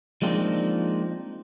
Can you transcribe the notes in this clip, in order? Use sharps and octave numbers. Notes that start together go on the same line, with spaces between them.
F3 G#3 A#3 C4 D4 D#4